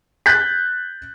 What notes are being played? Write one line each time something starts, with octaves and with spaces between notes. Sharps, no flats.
F#6 G6 A6 B6